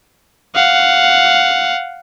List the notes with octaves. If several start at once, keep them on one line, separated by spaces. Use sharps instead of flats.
F5 F#5